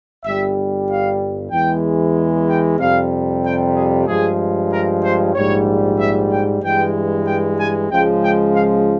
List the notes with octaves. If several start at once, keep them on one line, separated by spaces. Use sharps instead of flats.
G1 G2 G3 E5
F5
E2 E3 G#3 G5
G5
F2 C3 G3 F5
G5
G#4
G2 F3 G#3 G#4
A#4
C5
A#1 G#2 G3 C#5
E5
G5
G2 E3 G#3 G5
G5
G#5
C#2 C#3 F3 G#3 G5
G5
F5